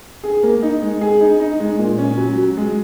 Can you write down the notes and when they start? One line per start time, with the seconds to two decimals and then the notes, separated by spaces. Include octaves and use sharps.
0.24 G#4
0.43 A#3
0.62 D#4
0.82 G#3
1.01 G#4
1.21 D#4
1.40 D#4
1.60 G#3
1.79 A#2
1.98 C#4
2.17 F#3
2.38 F#3
2.57 G#3